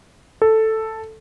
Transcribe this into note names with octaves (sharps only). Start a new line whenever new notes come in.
A4